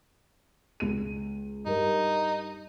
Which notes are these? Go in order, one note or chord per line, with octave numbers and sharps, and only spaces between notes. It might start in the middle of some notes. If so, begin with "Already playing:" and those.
C#2 D#7
G2 D#4 A#4